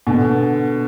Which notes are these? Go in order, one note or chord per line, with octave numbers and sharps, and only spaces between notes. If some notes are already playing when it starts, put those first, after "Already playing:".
B2 D3